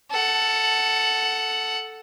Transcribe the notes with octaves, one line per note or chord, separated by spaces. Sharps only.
A4 F#5